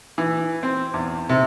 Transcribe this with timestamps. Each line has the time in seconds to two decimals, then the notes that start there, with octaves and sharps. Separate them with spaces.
0.18 E3
0.63 C4
0.94 E2
1.29 C3